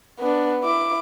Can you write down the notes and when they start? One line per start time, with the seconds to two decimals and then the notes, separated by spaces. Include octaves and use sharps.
0.19 B3 D4
0.64 E4 D6